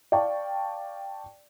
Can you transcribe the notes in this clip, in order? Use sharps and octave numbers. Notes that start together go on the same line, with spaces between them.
D5 F5 G5 A5 C#6